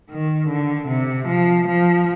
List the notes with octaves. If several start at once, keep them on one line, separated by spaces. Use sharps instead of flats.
D#3
D3
C3
F3
F3